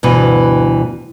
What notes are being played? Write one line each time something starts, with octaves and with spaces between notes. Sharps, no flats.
D2 G2 B2 E3